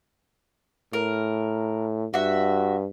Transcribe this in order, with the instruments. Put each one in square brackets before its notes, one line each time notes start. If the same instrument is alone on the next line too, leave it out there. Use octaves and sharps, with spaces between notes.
[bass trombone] A2 [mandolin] A#4
[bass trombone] G2 [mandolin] F#4 E5